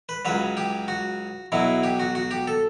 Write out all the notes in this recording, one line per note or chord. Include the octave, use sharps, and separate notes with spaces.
B4
C#2 C#3 F#3 B4
G4
F#4
B1 B2 F#3 E4
G4
F#4
F#4
G4
A4